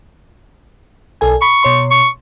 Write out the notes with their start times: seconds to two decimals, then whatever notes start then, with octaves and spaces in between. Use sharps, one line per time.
1.21 B1 A4 G#5
1.42 B5 C#6
1.63 B2 C#5 C6
1.91 C#6